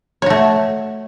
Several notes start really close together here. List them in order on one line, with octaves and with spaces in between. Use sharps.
C#5 F#4 A3